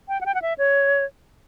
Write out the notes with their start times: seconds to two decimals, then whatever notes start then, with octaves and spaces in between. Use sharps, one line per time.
0.08 G5
0.21 F#5
0.26 G5
0.35 F#5
0.42 E5
0.58 C#5